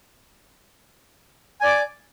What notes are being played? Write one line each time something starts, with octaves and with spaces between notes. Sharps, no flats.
D5 G#5 D6